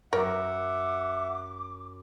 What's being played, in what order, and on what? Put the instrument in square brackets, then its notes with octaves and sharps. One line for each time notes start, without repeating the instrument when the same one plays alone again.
[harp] F#2 C#7 [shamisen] A#4 C#5 [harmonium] E5 F#5 [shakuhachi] D6